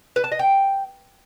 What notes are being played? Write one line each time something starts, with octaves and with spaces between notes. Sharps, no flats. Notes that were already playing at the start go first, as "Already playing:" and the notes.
B4
A5
D#5
G5